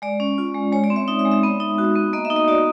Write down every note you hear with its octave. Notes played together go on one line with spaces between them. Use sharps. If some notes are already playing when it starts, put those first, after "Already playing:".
G#3 D5
C#4
F4
G#3
G#3 C#5
D5
C4
E5
D#4 E5
E5
G#3
E5
B3
D#4
F#4
B3
A#3 D#5
E5
D#4
D#5
F#4 D5